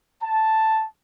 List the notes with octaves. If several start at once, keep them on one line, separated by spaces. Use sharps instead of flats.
A5